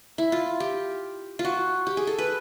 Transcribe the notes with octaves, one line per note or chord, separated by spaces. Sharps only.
E4
F4
G4
F4
F#4
G4
G#4
A4
B4